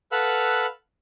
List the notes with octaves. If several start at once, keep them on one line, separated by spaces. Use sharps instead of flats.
A4 B4 F5 F#5 B5 E6